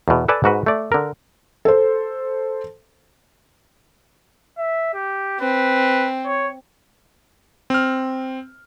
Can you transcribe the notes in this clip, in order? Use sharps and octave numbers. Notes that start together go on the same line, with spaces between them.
E2 B2
A4 B4 D5 G#5 A5
G#2 F#4 B4
A3 D5
D3 A#4
A4 C5
E5
G4
C4 B4
C#5
C4 F6